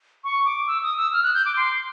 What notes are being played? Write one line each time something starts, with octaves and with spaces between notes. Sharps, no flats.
C#6
D6
E6
D#6
E6
F6
F#6
G6
D6
C6